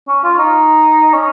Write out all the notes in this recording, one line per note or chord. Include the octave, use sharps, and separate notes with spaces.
C#4
F4
D#4
C#4